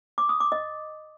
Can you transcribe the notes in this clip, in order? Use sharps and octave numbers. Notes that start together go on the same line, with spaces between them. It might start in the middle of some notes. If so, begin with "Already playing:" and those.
D6
D#6
D6
D#5